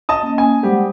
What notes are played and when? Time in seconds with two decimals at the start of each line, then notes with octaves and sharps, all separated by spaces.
0.09 D#5 A5 D#6
0.23 A#3 C#4
0.38 G#5
0.63 G3 G#3 G4 C5 F#5